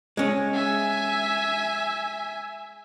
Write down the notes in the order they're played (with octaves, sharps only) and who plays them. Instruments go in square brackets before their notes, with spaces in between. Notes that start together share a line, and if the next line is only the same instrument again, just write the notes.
[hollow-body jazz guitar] G#3 C#4
[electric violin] E5 G#5